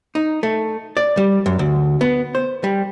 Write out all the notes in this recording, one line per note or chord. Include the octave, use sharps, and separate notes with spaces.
D#4
A3
D5
G3
F#2
D2
B3
C5
G3